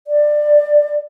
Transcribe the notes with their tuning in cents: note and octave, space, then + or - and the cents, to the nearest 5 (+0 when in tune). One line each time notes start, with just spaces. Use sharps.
D5 +15